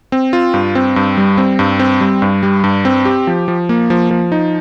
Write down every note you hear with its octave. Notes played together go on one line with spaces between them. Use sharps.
C4
F4
G2
C4
G2
G3
C4
G2
C4
G3
G2
G3
G2
C4
G4
F3
F3
A#3
F3
F3
D#4